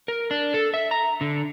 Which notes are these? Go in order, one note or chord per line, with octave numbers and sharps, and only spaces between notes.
A#4
D4
A4
E5
A#5
D3